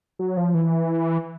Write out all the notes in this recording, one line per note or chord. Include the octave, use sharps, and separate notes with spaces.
F#3
F3
E3